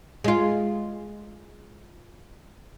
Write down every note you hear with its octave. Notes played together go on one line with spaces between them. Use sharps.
G#3 F4